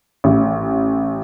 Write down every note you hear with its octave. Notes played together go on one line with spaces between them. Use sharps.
A1